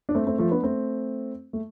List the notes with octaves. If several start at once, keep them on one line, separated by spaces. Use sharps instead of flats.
D4
A3 C4
A3 C4
F3 A3
B3 D4
A3 C4
A3